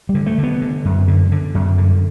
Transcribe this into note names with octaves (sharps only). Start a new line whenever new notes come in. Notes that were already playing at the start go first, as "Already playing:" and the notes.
G3
D3
A3
D3 B3
D3
F#2
D3
D3
F#2
D3